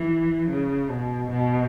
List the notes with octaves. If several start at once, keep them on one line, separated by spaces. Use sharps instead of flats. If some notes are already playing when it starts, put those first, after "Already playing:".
Already playing: E3
C#3
B2
B2